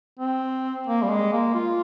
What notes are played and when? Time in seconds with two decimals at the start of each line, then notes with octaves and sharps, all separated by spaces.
0.19 C4
0.87 A#3
1.03 G3
1.10 G#3
1.33 A#3
1.54 F4